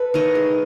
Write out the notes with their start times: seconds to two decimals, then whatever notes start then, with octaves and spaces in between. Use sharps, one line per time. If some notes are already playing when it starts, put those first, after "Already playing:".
Already playing: A4 B4
0.14 D#3 C#5 D#5
0.35 G#3